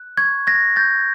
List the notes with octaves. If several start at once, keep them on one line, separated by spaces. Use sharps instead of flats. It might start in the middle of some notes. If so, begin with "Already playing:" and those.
Already playing: F#6
C#6 G#6
F#6 G#6 A#6
C#6 G6 A6